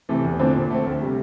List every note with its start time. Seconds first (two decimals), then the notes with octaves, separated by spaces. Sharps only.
0.09 C3 E3 A3
0.25 E2
0.39 D3 F3 A3 C4
0.55 A#2
0.70 A3 C4
0.86 D2
1.02 C3 G3